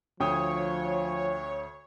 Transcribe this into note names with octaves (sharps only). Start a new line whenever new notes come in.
D2 F3 C#5 G5 D#6